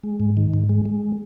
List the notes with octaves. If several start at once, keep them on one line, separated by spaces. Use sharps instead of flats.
G#3
G#2
D#3
G#2
G#3
G#3